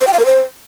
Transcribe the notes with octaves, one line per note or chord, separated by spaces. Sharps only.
C5
G5
F5
A#4
C5